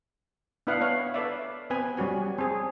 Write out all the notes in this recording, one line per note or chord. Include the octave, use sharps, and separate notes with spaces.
B3 D4 E4 B4 F5 F#5
B3 C#5 F5
A4 B4 D5 E5
B3 C4 B4 G#5
G3 C#4 F#4 G#5
C4 G#4